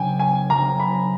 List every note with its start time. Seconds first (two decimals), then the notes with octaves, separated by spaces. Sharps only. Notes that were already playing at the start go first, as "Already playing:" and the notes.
Already playing: C#3 F#3 B3 G5 G#5
0.19 G#5
0.50 C#3 F#3 B3 A#5
0.80 B5